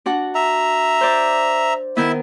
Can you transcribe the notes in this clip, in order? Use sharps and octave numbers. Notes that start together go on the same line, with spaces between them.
D4 F#4 F#5
E5 A#5
C5 D5
D#3 B3 E4 E5